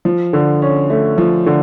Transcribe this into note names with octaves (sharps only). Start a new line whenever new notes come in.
F3
D3
C#4
A3
F3
D3